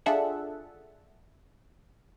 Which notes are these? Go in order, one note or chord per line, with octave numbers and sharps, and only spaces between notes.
D4 F4 G#4 A4 E5 F#5